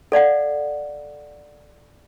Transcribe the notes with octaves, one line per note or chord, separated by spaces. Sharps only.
A4 D5 F5 F#5